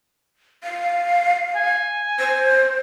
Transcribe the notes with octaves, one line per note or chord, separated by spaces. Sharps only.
F5
G#5
C5